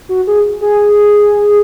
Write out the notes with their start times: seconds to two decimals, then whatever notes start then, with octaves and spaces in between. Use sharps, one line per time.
0.09 F#4
0.27 G#4
0.61 G#4